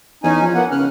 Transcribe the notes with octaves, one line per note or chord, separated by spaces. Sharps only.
E2 C#4 D#4 G#5
F3
A#3 B3 F#5
C#3 F6 F#6